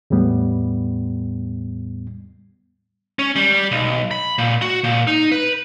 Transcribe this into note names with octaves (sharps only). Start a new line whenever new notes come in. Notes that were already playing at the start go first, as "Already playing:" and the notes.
E2 A2 G3 B3
C#4
G3
B1
B5
A#2
F#4
A#2
D#4
B4